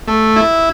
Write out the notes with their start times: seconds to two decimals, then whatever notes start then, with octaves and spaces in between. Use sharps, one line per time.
0.08 A3
0.36 E4